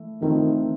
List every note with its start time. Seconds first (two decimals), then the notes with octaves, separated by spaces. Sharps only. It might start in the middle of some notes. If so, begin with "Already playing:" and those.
Already playing: E3 A3
0.21 D#3 E3 A3 C4 F4 A#4